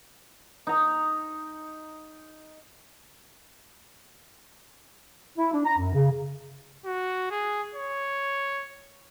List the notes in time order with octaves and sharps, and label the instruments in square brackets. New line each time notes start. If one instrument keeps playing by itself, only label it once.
[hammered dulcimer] D#4 A#5
[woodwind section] E4
D4
A#5
F#2
C#3
[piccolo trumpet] F#4
G#4
C#5